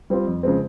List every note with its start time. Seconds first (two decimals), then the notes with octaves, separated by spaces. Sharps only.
0.10 G3 C4 F4
0.27 F2
0.43 C#3 F3 G#3 C4